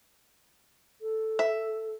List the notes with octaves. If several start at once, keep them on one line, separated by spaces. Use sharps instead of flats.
A4
E5